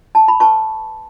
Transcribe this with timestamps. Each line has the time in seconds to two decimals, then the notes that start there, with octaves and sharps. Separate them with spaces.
0.15 A5
0.28 B5
0.40 B4 A5 C#6